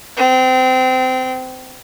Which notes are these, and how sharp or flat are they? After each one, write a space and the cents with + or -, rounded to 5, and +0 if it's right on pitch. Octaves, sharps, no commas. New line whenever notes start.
C4 -25